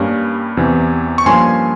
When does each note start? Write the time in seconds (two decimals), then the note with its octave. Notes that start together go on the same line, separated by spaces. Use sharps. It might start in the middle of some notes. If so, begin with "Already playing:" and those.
Already playing: G2 G3 A#3 C#4
0.57 E2 C3 E3
1.18 C#6
1.26 G2 F3 A#3 C#4 G#5 C6